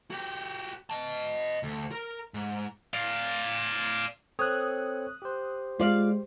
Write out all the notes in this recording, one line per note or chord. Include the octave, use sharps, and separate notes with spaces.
F#4 G4
D#5 A5
D2
A#4
G#2
D5 F5
C4 A4 C#5 D#6 F#6
G4 C5
G#3 F4 D5 F5